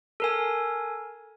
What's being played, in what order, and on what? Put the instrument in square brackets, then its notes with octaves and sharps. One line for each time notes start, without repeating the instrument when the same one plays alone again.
[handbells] A4 A#4 G#5